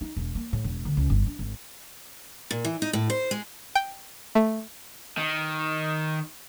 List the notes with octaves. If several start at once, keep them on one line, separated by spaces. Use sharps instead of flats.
D#4
E1
A#3
A2
E1
D2
C#2
G1
D4
G#1
A#2
E3
D#4
A2
C5
G#3
G5
A3
D#3